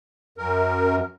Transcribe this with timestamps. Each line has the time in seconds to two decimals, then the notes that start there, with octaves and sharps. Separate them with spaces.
0.38 F#2 A#4